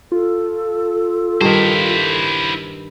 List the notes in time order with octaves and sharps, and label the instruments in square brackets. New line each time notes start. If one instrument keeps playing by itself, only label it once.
[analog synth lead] F4 [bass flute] A4
[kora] G2 D#3 [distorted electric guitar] E4 C5